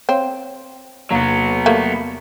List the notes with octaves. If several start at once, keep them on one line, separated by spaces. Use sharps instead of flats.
C4 C#5 F5
E2 C3 F#3 A#3 B3
G3 A3 A#3 A5